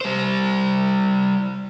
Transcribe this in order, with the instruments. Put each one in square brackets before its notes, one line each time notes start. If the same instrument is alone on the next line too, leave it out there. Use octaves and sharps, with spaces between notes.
[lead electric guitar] G3 C5